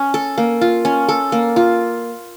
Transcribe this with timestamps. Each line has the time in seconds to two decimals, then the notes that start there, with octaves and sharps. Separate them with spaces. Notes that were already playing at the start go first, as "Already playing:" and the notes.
Already playing: C#4
0.14 A4
0.38 A#3
0.61 F4
0.85 C#4
1.09 A4
1.32 A#3
1.56 F4